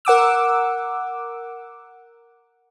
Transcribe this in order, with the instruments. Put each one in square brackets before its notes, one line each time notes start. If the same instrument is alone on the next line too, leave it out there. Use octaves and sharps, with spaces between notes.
[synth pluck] A#4 F#5 D6 E6